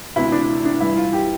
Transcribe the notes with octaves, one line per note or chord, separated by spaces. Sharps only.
D2 C3 E3 E4
D4
D4
G2 E3 E4
F4
G4